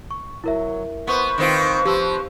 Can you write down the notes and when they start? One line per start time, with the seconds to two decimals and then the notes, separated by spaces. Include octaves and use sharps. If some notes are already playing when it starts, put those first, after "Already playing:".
0.11 C#6
0.44 F#3 E4 A#4 E5
1.07 B3 B4 C5 C#6
1.38 D#3 C4 F4
1.85 F3 G4 E6